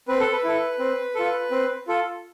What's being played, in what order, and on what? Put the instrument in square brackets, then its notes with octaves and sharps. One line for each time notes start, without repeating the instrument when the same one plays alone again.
[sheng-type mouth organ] C4 B4
A4
B4
E4 A4
C4
F4 A4
C4
F4 A4